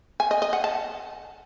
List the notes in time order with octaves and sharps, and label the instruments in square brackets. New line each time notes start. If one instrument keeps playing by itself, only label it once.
[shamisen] G#5
D#5
D#5
F#5
A5